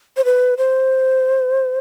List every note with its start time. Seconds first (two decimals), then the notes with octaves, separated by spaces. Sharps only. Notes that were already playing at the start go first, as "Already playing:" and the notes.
0.17 C5
0.25 B4
0.57 C5